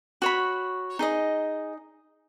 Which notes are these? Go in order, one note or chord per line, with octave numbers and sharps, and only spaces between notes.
F#4 C#5 B5
D#4 G#4 D#5